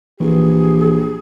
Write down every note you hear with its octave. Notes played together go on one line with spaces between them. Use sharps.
A#1 E3 G4 G#4